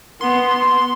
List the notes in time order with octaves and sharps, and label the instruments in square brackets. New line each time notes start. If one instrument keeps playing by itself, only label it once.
[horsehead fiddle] B3 [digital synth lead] C6